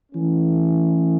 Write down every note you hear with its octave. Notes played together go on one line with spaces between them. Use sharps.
E3 A3 C#4